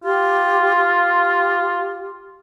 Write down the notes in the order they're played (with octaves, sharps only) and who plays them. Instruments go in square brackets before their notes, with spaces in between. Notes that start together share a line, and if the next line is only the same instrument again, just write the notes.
[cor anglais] F4 [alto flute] G4
[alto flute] G4